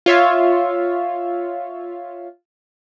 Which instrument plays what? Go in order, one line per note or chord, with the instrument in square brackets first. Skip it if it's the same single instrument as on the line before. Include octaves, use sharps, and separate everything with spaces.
[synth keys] F4 C#5 E5 F5